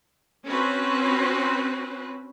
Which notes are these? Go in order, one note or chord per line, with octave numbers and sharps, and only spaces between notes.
C4 C#4 F#4 B4 C5